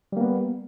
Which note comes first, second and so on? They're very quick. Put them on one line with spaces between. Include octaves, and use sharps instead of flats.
G3 A#3 B3